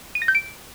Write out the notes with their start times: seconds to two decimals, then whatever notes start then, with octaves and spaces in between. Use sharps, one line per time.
0.15 D#7
0.22 A#6
0.28 G6
0.35 D7